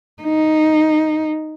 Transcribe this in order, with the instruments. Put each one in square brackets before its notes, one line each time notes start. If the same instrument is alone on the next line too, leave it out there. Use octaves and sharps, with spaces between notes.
[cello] D#4